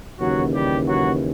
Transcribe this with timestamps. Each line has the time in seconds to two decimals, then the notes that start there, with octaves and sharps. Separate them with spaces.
0.19 D#2 C#3 E3 F#3 F#4
0.53 G3 G4
0.87 F#3 F#4